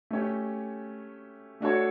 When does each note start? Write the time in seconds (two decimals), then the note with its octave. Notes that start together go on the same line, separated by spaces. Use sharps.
0.11 A3 C#4 G4
1.61 A3 D4 F#4 A4 C#5